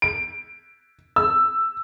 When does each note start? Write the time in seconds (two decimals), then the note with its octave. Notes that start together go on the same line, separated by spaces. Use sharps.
0.02 D7
1.16 E6